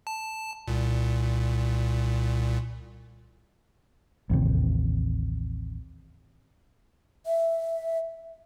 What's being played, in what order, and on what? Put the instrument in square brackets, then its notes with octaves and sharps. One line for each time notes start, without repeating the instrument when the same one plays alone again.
[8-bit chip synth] A5
C2 A#2
[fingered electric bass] A1 D#2 C3
[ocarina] E5